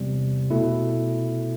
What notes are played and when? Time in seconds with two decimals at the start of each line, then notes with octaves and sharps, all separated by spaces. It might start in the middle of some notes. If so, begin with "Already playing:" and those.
Already playing: E2 C3 G3
0.50 B2 A3 E4